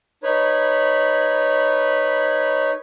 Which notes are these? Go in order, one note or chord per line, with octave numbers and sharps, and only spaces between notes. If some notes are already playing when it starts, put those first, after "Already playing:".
D#4 B4 C#5 B5